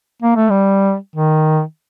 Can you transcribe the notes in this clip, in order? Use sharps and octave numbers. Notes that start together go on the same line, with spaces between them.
A#3
A3
G3
D#3